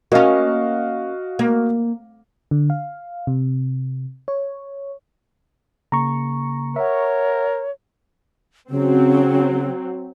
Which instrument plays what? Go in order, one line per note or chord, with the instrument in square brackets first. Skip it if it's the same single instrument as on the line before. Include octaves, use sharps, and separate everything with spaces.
[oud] A#3 C#4 [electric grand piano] F#4 D#5 F5
[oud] A#3
[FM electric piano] D3
F5
C3
C#5
[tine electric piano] C#3 A#3 [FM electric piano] A#5 C#6
[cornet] A#4 [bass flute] C#5 [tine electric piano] E5 F#5
[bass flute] C#3 [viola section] F#3 C4